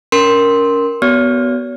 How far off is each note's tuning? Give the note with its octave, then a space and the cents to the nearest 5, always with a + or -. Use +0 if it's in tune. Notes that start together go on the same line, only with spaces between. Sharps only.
C#4 +30 A#4 +0 C6 +0
B3 +0 F#4 +30 C#5 +40